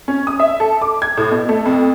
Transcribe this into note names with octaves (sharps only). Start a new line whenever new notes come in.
C#4
D#6
E5
A4
D6
G#6
A2
B2
A3
F2